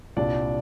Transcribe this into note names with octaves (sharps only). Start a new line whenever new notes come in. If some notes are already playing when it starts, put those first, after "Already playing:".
C2 A#2 G3 D4 D5